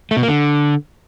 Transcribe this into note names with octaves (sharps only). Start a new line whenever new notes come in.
A3
B2
A#3
D3